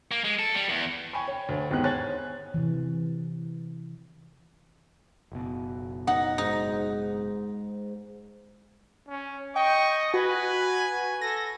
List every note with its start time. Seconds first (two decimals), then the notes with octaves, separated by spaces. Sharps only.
0.11 A#3
0.24 G#3
0.39 A4
0.55 G3
0.69 E2
1.13 G5 G#5 B5 C#6
1.28 C#5 G5
1.49 D2
1.71 D#2 G#2 B2 B3 F#6
1.84 C5 C#5 G#5 F#6 A6
2.54 C3 E3
5.32 F#1 B2
6.07 D#4 F#5
6.38 G#2 D#4
9.08 C#4
9.56 D#5 G5 C#6
10.14 F#4 B4 G#5
11.21 A4 A#6